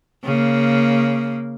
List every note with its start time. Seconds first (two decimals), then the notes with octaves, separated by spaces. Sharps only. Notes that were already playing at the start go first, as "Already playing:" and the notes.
0.24 C#3 A#3